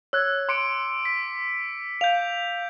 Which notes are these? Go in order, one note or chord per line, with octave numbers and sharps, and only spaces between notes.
C#5 E6 F#6 G#6
C6 D6 C#7 D7
B6
F5 G6 F7